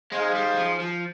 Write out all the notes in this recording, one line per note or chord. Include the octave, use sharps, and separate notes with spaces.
G#3 D#4 G#4 C5 F5
G3
F3
F3